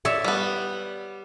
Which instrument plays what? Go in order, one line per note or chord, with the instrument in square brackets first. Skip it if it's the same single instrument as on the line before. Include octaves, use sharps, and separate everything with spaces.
[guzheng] C#5 D5 E5
[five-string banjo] G3 B3